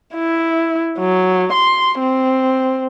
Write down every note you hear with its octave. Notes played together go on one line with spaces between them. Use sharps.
E4
F#3
C6
C4